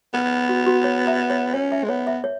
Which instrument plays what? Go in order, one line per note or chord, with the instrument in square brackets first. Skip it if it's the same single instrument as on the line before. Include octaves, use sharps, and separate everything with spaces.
[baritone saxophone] B3 [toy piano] B4
[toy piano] F#4
F#4
C#5
E5
C#5
[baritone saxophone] C#4 [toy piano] C#5
[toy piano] E5
[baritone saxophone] G#3
[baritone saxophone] B3 [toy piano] C#5
[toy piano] E5
C#5